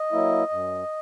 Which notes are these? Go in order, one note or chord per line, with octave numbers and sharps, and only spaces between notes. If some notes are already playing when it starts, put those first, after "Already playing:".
Already playing: D#5
F#3 A#3 E4
F#2